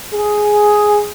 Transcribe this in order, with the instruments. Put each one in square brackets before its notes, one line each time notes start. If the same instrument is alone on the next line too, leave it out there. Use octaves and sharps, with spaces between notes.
[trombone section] G#4